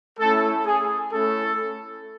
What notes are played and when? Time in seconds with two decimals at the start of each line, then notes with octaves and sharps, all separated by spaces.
0.19 A3 C#4 E4 A4
0.66 G#4
1.12 A3 C#4 E4 A4